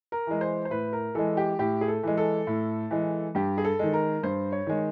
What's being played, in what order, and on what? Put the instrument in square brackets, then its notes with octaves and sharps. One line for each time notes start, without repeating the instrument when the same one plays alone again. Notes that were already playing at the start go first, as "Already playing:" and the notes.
[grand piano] A#4
E3 G#3
C5
C5
A2 B4
A#4
E3 G#3 A4
G4
A2 G4
G#4
A4
E3 G#3
A4
A2
E3 G#3
G2 G4
G#4
A4
D#3 G#3
A#4
G2 C5
C#5
D#3 G#3